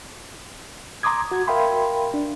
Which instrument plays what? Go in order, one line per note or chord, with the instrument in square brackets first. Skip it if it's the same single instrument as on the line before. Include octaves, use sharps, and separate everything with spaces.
[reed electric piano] A#5 C6 D6 D#6 G#6
F#4 G#6
A#4 E5 F5 G5 B5 C6
D4